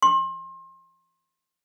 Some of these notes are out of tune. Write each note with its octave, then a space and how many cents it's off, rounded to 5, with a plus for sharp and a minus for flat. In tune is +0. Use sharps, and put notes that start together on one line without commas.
C6 +35